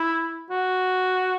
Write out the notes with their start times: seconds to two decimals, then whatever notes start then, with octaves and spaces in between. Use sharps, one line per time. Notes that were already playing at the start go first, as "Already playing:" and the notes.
Already playing: E4
0.50 F#4